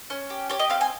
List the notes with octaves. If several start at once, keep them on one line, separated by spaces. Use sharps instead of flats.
C#4
G4
G4 C#5
D#5
C4 F5
G#5